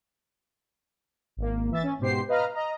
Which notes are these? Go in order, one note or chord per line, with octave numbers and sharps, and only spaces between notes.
G#1 A#3
E3 E5 A6
C#4
G#2 B2 G4 C5 C7
B4 D#5 F5 A#5 F6
D#5 A#5